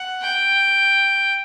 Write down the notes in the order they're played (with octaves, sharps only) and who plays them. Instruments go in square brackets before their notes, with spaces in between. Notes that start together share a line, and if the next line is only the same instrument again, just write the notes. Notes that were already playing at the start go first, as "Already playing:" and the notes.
Already playing: [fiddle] F#5
G5